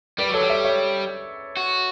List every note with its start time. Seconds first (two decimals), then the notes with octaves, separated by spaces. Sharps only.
0.18 G3 B4 D5
0.30 F#3 A4 C#5
0.41 G3
0.49 C#5 E5
0.65 C#5 E5
1.57 F#4